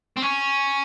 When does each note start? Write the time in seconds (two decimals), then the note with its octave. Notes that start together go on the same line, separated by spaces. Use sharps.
0.17 C4
0.22 C#4